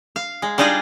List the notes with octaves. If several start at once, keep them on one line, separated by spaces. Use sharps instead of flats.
F5
G#3
G3 D4 D#4 F4 G#4 D5